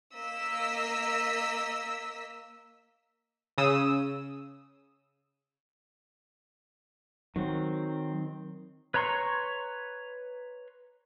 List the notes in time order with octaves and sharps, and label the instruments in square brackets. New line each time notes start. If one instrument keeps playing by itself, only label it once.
[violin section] A#3 A#4 D#5 E6 B6
[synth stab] C#3 D#6 E6
[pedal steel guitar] D#3 C4 [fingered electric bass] F#3
[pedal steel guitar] B4 C#5 A#5 C6 C#6